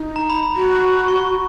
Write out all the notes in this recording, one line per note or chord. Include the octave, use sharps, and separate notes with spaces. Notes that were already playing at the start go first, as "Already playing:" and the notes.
Already playing: D#4
A#5
B5
B5
F#4
C#6